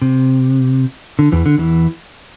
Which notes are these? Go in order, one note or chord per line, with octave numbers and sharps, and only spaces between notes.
C3
D3
E2 E3
D3
E2 E3